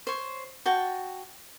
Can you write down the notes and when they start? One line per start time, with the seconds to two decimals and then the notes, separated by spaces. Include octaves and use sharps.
0.07 C5 C#5
0.66 F#4 G5 A5